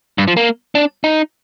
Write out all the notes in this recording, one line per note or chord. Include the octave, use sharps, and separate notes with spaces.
G2
F3
A#3
D4
D#4